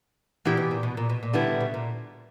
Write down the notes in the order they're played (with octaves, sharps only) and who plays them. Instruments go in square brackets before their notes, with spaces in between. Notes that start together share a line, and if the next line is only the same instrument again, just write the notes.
[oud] A#2 [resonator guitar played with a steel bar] E3 B3 E4 G4
[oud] B2
A#2
B2
A#2
B2
A#2
[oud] B2 [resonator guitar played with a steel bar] D3 G3 B3 E4
[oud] A#2
B2
A#2